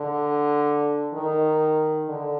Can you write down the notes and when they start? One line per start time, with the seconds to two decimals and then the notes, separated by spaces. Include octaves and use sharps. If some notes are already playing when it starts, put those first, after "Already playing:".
Already playing: D3
1.14 D#3
2.09 D3